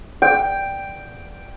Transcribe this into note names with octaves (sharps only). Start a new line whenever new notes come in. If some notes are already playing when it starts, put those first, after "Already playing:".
G5